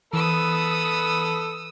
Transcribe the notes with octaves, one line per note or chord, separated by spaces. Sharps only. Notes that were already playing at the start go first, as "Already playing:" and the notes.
E3 B3 A4 B5 D#6 E6